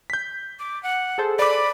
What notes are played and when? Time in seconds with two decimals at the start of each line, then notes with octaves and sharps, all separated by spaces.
0.10 G6 B6
0.59 D6
0.83 F#5
1.18 G#4 A4 C5
1.39 D5 B5 D6